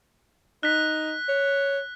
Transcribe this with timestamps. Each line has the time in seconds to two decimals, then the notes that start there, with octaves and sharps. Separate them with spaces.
0.63 D#4 F#6 B6
1.29 C#5